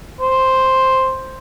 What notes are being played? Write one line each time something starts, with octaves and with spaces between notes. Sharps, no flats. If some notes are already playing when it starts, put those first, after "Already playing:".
C5